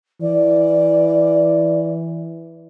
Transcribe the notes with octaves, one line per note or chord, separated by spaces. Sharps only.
E3 D5